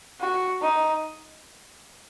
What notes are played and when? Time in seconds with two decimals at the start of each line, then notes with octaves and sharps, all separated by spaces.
0.20 F#4
0.62 D#4